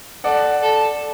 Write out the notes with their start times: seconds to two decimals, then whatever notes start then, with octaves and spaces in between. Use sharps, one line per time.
0.24 A4 D5 F#5
0.62 A4